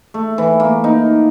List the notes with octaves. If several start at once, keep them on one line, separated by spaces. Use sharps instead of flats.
A3
E3
A#3
D#4